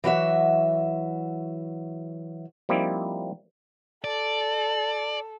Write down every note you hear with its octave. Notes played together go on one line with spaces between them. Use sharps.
E3 F#3 F#4 E5
F3 G3 A#3 C4 D#4 E4
A4 D5